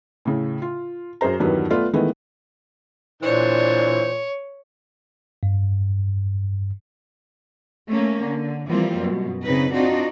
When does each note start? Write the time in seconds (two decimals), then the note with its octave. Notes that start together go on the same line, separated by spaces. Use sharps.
0.25 A2 C#3
0.62 F4
1.21 F#2 G#4 C5 A#5
1.40 E2 G2 D#3 F#3 G3 B3
1.70 A3 B3 F4 D5
1.93 D#3 E3 G#3 A3 B3
3.23 A#2 E3 D4 C5 C#5
5.43 G2
7.88 A3 A#3 C#4
8.23 D3
8.68 E3 F3 G3 A#3 C4 F4
8.99 F#2 B2
9.43 C#3 C4 D#4 B4
9.73 C4 D4 D#4 F4 F#4